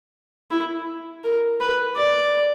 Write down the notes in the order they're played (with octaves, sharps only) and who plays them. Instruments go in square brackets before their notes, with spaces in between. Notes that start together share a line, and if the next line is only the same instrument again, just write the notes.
[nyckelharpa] E4
A#4
B4
D5